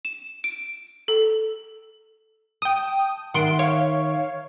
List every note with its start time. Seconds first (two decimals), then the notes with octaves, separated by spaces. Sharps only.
0.05 E7
0.44 D7
1.08 A4
2.62 G5 A5 D#6
3.34 D#3 E5 F#5 C6 D7
3.59 C#5 F5